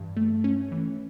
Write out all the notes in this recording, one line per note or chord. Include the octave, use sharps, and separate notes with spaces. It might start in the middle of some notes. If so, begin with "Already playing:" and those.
Already playing: G2 E3
A3
C#4
E3